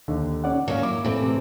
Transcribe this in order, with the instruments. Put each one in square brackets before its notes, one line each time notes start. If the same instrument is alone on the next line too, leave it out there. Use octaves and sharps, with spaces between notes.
[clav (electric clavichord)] D#2 D3
[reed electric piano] C#4 D5 F#5
[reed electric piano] G#2 [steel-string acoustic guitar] F#3 C#4 [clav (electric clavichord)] A#3 F5
[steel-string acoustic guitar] E4 [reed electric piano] D6
[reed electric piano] A2 A3 [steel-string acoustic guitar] E3 C4
[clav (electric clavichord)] C3